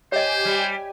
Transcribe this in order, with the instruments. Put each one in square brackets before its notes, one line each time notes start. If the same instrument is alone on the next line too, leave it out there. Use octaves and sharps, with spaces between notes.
[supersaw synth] G4 G#5 [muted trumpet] C5 [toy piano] C#5 D#5
[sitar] G3